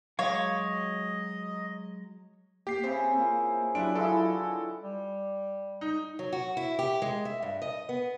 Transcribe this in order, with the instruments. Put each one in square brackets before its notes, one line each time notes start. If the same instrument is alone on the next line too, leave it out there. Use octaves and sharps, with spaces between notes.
[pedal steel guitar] F#3 G#3 D6 [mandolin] C#5 [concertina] D#5 [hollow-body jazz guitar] F5
[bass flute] A#3 [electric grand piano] G4 C7
[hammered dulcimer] C#3 E4 [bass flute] C4 [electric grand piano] C5
[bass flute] A#3 [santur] F4 A#4
[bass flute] F#3 [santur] G3 E4 [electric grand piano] D4 D7 [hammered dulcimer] F4 B4
[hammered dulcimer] D3 G#3 D#5 [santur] E4 F5 C#6 [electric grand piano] A4
[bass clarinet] G3
[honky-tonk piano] D#4
[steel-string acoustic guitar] F#3
F#4
E4
G4
G#3
E5
G2
D#5
B3